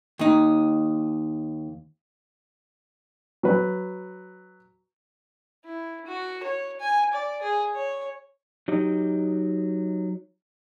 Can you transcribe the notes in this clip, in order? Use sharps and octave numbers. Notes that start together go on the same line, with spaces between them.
D#2 D#4
F#3 B4
E4
F#4
C#5
G#5
D5
G#4
C#5
F#3 D#4 G4 D#5